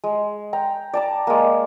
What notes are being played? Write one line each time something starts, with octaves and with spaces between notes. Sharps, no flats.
G#3
G5 A#5
D5 A5 A#5
G#3 A#3